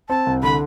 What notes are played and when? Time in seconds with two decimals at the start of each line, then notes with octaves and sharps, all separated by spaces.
0.09 C4 A5
0.26 C2
0.43 D3 B5